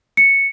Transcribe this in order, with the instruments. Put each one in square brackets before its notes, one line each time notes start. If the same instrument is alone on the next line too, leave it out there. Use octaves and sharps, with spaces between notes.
[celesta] C#7